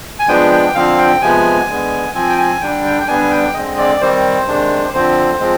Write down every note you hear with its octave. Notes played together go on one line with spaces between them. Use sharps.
G#5
F3 G#3 B3 D4 G5
G5
D3 F3 C4 F5
G5
C3 F3 G#3 B3 G#5
D3 G#3 B3
F3 C4 G#5
G5
G#5
D3 G3 D4 G5
G5
G5
D3 G3 B3 D4 G#5
G5
D3 G#3 C4 D#5
D5
D#3 G3 C4 C5
C3 D#3 G#3 D4
D3 F3 C4 C5
F3 G#3 C4